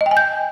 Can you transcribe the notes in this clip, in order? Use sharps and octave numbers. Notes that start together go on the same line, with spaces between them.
D#5
G5
G#5
G6